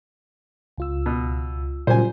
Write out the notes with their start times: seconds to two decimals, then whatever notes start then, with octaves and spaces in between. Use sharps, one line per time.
0.78 C#2 F4 E6
1.06 B2
1.87 A#2 C#3 F#3 G3 C5 G#5